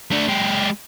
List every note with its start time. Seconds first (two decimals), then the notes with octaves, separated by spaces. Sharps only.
0.11 A3 D4
0.28 G#3 G4